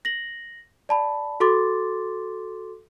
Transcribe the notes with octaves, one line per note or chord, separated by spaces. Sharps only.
A#6 F#7
D5 A5 B5
F#4 A4 C6 D6 A6